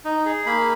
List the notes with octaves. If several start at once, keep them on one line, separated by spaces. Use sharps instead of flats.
D#4
G#4
A#3 B5